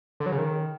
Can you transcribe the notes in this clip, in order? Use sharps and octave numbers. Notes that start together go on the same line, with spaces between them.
D3
F#3
C#3
D#3